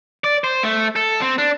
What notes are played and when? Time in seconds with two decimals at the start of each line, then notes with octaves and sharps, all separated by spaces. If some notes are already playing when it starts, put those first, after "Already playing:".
0.24 D5
0.44 C5
0.63 A3
0.96 A4
1.21 C4
1.38 D4